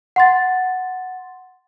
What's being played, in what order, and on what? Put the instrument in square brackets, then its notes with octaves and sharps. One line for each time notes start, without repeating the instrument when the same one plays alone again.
[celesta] F#5 C6 A6